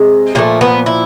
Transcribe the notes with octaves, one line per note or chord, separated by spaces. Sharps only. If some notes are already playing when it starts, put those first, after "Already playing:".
Already playing: C3 G#3
A#2 F3 A3 A#3
B3
E4